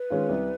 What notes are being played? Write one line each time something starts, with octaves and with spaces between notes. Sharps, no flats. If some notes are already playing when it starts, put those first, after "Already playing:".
Already playing: B4
D#3 G#3 C#4 F4
C2